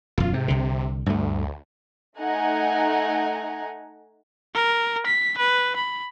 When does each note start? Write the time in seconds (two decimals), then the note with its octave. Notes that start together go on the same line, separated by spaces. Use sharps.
0.18 E1 F#2 F4
0.34 G#2 C3
0.48 C2 D3
1.06 D2 G2 A3
2.17 A3 D#4 F#5 G#5 A#5
4.55 A#4
5.06 B6
5.38 B4
5.76 B5